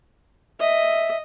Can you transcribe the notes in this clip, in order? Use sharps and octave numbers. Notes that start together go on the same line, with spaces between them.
D#5 E5